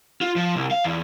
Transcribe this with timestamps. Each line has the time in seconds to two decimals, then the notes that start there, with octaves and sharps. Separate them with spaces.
0.21 F4
0.36 F3
0.56 C2
0.71 F5
0.84 E2